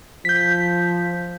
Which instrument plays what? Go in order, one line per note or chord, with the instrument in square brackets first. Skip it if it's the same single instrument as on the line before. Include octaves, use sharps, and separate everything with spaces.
[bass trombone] F3 [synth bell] G6 B6